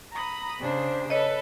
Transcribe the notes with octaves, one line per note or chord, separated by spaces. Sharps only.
A#5 B5 D#6
C#3 D4 C5
A4 B4 C#5 D#5